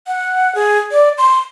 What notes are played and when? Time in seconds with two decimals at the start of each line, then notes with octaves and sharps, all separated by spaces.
0.07 F#5
0.55 G#4
0.91 D5
1.18 C6